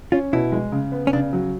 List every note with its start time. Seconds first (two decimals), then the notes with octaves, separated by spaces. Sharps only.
0.12 C#4 F4
0.33 B2 E4
0.52 G#3
0.72 C#3
0.92 B3
1.07 C#4
1.13 C#3 D4
1.33 F#3